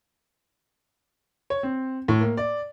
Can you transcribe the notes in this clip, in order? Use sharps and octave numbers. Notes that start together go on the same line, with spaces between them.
C#5
C4
A2
A#3
D5